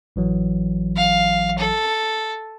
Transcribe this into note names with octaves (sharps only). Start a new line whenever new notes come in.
A1 E3 F#3
F5
A4